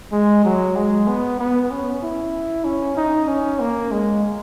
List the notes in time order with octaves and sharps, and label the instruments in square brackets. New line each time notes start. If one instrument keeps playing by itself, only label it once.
[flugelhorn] G#3
F#3
G#3
B3
B3
C#4
E4
C#4
D#4
C#4
A#3
G#3